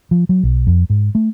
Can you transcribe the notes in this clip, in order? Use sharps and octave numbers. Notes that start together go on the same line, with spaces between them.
F3
F#3
B1
F2
G#2
A3